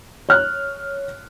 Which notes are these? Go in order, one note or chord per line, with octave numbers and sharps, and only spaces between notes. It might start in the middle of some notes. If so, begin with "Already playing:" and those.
C#5 F6 F#6